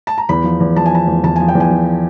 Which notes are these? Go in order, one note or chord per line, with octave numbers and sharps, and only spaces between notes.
A5
A#5
E2 B5
F3
E2
F3 A5
G#5
F3 A5
E2
E2 A5
F3 G#5
G5
E2
G#5
F3